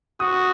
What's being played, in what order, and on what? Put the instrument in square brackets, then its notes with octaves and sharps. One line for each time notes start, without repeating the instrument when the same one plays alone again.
[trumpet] F#4 [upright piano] D#6